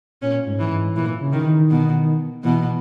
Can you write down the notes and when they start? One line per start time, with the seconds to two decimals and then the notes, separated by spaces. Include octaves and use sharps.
0.22 A#2 C#4
0.46 G#2
0.59 E3
0.72 G#2
0.95 A#2 E3
1.20 C#3
1.32 D#3
1.45 D#3
1.70 B2
2.43 B2 E3